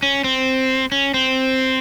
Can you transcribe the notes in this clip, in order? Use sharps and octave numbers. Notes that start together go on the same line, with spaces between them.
C#4
C4
C#4
C4